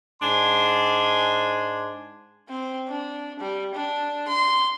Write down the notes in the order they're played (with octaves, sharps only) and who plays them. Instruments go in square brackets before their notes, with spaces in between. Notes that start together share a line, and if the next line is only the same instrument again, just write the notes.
[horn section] G#2 D4 G#5 C6
[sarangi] C4
D4
G3
D4
C6